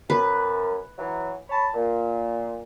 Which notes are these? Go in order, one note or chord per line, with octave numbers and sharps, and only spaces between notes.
F#2 B4
E3 F#3
C#5 A5 B5
A#2